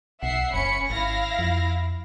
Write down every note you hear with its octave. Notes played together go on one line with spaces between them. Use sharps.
B1 E5 F#5 C7
F#1 C#4 B5 C#7
G#1 E4 F5 A#6
F2